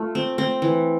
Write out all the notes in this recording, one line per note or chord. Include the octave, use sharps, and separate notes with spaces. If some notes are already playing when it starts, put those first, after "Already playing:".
Already playing: A3 F4
C4
C4
E3